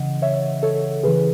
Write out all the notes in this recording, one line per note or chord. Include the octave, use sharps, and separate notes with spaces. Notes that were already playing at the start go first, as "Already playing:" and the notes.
Already playing: C#3 E3 D#5 F#5
C#5 E5
A4 C#5
C#3 E3 G#4 B4